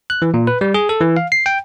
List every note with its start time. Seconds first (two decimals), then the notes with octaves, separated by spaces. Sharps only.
0.10 F#6
0.22 E3
0.34 A#2
0.47 B4
0.61 G3
0.74 G#4
0.89 A4
1.01 E3
1.17 F5
1.32 C7
1.46 G5